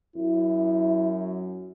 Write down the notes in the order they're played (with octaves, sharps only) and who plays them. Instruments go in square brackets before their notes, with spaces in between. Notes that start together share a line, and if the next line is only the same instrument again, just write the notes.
[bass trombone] F#2 [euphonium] E4